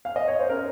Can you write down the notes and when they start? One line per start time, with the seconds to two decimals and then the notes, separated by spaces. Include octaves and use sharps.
0.05 F5
0.16 D#5
0.28 C#5
0.39 C5
0.49 C#4 A#4